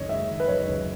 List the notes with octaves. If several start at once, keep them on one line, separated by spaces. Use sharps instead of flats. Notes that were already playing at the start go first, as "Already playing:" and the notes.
Already playing: F#1 F#2 D#3 C#5 D#5
G#3 E5
D#3
B4
F#2 C#5
F#1